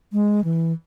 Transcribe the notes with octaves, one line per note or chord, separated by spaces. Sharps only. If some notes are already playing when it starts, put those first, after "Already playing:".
G#3
E3